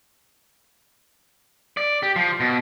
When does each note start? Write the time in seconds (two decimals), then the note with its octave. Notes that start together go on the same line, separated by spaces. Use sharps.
1.77 D5
2.03 G4
2.16 F3
2.40 B2